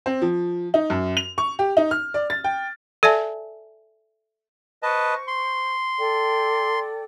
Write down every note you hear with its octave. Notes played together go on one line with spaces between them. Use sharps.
C4
F3
D#4
F#2
F7
C#6
G4
D#4
F6
D5
A6
G5
A4 D5 E5 G#5 A5
B4 C5 D#5 A5 C#6
C6
A4 D5 G5